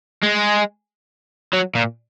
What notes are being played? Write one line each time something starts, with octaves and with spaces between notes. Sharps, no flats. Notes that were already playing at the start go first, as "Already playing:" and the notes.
G#3
F#3
A#2